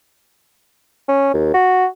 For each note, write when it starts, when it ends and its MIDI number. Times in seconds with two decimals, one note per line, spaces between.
1.09 1.31 61
1.34 1.54 39
1.54 1.86 66